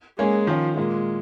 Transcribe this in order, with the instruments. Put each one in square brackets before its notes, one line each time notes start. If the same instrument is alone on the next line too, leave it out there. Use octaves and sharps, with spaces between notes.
[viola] G#3 [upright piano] A#3 C#4 G#4 C#5
[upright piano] D#3 C#4 F4 [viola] F3
[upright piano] A#2 A#3 F4 [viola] G#3